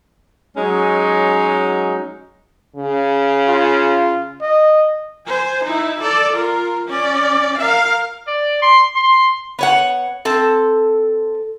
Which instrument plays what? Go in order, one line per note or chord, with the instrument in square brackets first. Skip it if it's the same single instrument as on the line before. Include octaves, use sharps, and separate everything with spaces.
[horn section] F#3 G#3 C#4 D#4
[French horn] C#3
[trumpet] F4
D#5
[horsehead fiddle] C5 G#5
D#4 E4
A4 D5
F4 A#4
C#4 D5
A#4 F5
[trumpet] D5
C6
C6
[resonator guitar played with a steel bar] B3 C#5 F#5
C4 A4